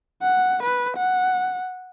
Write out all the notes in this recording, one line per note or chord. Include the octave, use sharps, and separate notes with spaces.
F#5
B4
F#5